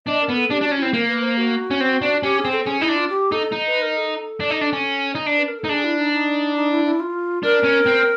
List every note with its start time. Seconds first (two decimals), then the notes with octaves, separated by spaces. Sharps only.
0.06 D4 D#5
0.21 A#4
0.29 B3
0.35 A4
0.50 D4 G4
0.61 D4 F#4
0.71 C#4
0.79 C4 E4
0.93 A#3 A#4
1.08 B4
1.22 C5
1.37 F#4
1.71 C#4
1.80 C4
2.02 D4
2.23 C#4 G4
2.38 G#4
2.45 C4
2.52 A4
2.66 C#4 G#4
2.81 D#4 E4
2.89 D4
2.96 F4
3.09 G4
3.32 D#4 A4
3.52 D#4
3.67 B4
3.82 A#4
3.96 A4
4.40 D4
4.51 D#4
4.61 D4
4.73 C#4
5.15 D#4
5.26 D4
5.37 B4
5.48 A#4
5.59 A4
5.64 D#4
5.69 D4 G#4
5.84 E4
5.99 D#4
6.13 D#4
6.56 D#4
6.71 E4
6.85 E4
7.00 F4
7.43 D4 A#4
7.64 C#4
7.87 C4